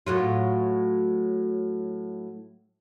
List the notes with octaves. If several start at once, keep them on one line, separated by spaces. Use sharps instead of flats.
A2 F#3 F4